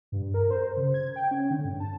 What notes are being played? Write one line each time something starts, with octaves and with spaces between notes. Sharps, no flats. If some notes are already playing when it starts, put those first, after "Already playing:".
G2
A#4
C5
C#3
G#6
G5
C#4
D3
G2
A5